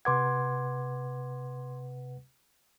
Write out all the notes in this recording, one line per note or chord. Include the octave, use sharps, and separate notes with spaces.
C3 B4 F#5 C6 D6 G#6